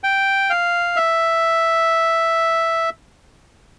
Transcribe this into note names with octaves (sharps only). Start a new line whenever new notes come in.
G5
F5
E5